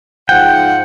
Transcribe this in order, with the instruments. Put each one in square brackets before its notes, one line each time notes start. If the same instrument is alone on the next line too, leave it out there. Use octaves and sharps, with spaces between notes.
[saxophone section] G#2 F3 F#5 [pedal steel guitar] G5